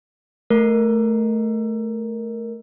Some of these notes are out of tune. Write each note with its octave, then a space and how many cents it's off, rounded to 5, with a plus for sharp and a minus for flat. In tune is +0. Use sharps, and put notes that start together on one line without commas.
A3 -5 A#4 +0